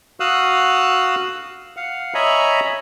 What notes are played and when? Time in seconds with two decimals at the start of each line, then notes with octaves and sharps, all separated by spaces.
0.20 F#4 F5 D#6 E6 F#6
1.77 F5 F#5
2.14 C#5 D#5 E5 G#5 A#5 B5